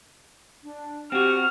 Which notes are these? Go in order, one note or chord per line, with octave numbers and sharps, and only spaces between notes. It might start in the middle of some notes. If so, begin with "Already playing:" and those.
D4
C4 F#4 G4 F#5 F6